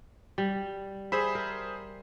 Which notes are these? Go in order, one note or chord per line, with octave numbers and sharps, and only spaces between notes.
G3
G#4 C5 E5 B5
A#4